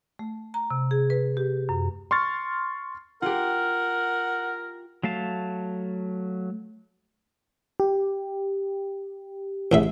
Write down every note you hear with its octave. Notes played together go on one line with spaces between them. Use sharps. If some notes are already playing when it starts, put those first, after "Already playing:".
A3
A#5
C3
G#4
B4
G4
F#2
C6 C#6 F6 A6
F4 G4 A#4 F#5
F#3 A3 F5 A5
G4
A1 C#3 E5